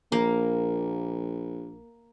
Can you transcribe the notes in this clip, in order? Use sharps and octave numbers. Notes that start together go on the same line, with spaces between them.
A#1 A#3